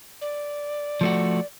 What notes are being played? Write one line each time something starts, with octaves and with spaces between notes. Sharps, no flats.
D5
F3 A3 F#4